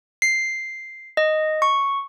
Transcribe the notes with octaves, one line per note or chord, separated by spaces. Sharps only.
C7
D#5
C#6